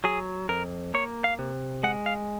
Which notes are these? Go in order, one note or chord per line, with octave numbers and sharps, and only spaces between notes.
F#3 G#4
F2 A#4
A#3 C#5
F5
C3
G#3 F#5
F5